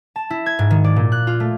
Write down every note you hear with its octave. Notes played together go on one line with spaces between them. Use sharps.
A5
E4
G#6
G#2
D#3
D5
A#2
F#6
F4
A3